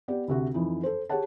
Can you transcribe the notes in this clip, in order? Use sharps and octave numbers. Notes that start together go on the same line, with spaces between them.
B3 G4 D5
D2 C3 F#4
F2 E3 D#4
A4 C5
G4 G#4 C#5 F#5 A5